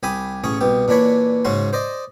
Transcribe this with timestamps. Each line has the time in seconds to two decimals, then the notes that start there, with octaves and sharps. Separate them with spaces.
0.03 C2 G4 G#5 B5 D#6
0.44 A1 C#4 G#4 C#5
0.61 C2 B2 G4
0.88 A#2 E3 D4 C#5 B5
1.45 G#2 C#3 C#4 F#4 C6
1.73 C5 D5 D#5